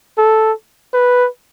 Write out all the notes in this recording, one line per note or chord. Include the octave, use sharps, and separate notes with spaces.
A4
B4